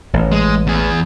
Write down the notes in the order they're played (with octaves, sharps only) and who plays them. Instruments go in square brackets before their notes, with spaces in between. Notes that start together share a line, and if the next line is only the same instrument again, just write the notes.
[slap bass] A1
[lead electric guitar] G#3
E2 G#4